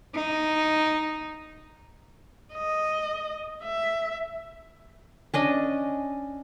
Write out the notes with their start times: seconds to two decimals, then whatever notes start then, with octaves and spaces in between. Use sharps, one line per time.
0.14 D#4
2.54 D#5
3.64 E5
5.34 C#4 D4 D#5